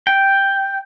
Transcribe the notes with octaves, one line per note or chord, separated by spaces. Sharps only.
G5